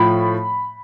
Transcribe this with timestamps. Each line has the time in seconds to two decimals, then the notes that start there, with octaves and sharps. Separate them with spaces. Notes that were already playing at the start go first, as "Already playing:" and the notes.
Already playing: A2 F3 B5